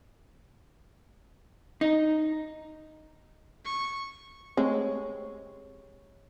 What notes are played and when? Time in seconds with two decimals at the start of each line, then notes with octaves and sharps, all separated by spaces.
1.81 D#4
3.66 C#6
4.57 G#3 A3 C4 G4 C#5